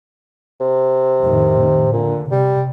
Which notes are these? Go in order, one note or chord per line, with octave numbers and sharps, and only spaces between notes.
C3
F2 A2 D#3
D#3
A#2 D3
C3 G3